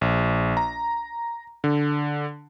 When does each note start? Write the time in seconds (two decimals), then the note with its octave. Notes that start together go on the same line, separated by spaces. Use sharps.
0.01 A#1
0.57 A#5
1.64 D3